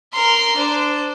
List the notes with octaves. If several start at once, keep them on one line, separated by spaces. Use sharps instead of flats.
A#4 C6
D4 C5